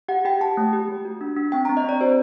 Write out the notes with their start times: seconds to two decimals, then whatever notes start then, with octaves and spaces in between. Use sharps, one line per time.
0.08 G4 F#5
0.25 G4 G5
0.41 G4 A5
0.57 A3
0.73 G4
0.89 A3
1.05 F#4
1.21 D4
1.36 D4
1.52 C4 G5
1.65 A#5
1.69 C4
1.77 D#5
1.84 C4 D5
2.01 F#4 C5